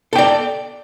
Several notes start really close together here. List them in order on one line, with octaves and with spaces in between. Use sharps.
A4 G5 D5